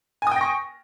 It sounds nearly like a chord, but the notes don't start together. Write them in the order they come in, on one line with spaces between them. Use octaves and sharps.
G#5 D#6 G5 A#6 C#6